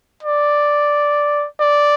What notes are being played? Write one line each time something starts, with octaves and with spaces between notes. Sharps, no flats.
D5
D5